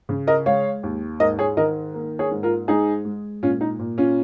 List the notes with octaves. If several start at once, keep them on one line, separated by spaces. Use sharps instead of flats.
C#3
A#4 D#5
G#3 C#5 F5
D#2
G#2 A#4 D#5
G#4 C#5
D#3 A#4 D#5
A#3
G#4 C#5
G#2
F4 A#4
G#3 D#4 G#4
G#3
A#2 C#4 F4
D#4
A#2
C#4 F4